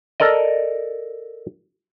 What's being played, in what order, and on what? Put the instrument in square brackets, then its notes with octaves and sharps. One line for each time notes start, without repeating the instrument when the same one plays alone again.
[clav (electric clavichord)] A4 A#4 D5 D#5